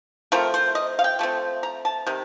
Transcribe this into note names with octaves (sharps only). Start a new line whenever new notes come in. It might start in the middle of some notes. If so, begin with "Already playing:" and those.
F3 A3 C4 A#4
C5
D#5
F5
G5
F3 A3 C4
A#5
A5
C3 D#3